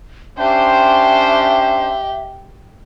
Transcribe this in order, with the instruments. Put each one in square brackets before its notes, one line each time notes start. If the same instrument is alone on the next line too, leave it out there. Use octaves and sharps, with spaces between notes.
[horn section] C#4 D4 C5 [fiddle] G4 G5 [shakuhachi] E5